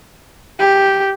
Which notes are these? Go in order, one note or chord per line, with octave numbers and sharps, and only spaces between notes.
G4